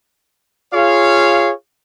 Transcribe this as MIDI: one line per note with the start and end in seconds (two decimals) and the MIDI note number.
0.74 1.52 65
0.74 1.52 68
0.74 1.52 73
0.74 1.52 77